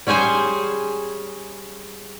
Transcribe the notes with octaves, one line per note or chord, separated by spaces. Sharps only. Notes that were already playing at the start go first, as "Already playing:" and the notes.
G3 C#4 G#4 C5 G#5